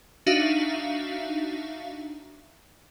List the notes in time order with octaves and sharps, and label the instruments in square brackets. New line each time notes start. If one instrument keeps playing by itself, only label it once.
[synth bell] D4 D#4 F#4 E5 F5